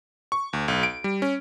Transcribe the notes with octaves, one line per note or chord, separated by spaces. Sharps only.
C#6
D2
B1
D7
G3
C#4